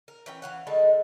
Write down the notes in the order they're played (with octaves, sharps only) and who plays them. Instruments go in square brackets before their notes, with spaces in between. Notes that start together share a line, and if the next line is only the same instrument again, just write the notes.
[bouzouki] A#4
E3 C#4 G5
E3 F5 F#5
D#3 G3 G#3 A4